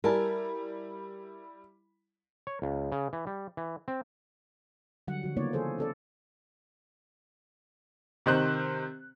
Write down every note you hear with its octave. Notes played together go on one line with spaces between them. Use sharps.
G3 E4 A#4 G#5 A5
C#5
C#2
C#3
E3
G3
E3
C4
D3 F#3 G3 F#5
D3 F3 F#4
C#3 A#3 B3 D#4 C#5 D5
E3 G#4 A4 C5
C#4 A4 D5
C3 D#3 C5 F#6